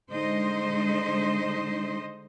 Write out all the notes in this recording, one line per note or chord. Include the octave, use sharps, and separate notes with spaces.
D3 G#3 D#4 C5 D#5